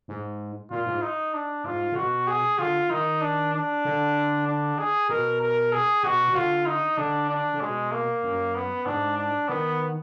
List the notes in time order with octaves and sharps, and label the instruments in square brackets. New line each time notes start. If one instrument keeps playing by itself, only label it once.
[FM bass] G#2
[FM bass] A#2 [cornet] F4
[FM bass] G#2
[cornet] D#4
D4
[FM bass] G#2 [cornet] F4
[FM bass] D3
[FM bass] B2 [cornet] F#4
[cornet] G#4
[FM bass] D3 [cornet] F4
[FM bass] D#3 [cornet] D#4
[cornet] D4
D4
[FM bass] D3
[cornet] D4
G#4
[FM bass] B2 [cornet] A#4
[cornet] A#4
G#4
[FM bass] B2 [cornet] F#4
[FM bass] B2
[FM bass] D3 [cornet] F4
[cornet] D#4
[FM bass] D3 [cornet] D4
[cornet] D4
[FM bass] D3
[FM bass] B2 [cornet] G#3
[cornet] A#3
[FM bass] F#2
[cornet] B3
[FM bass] G#2 [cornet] D4
[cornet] D4
[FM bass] D#3 [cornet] B3